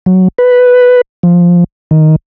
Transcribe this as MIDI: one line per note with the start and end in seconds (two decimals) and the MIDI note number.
0.06 0.28 54
0.38 1.01 71
1.23 1.64 53
1.91 2.16 51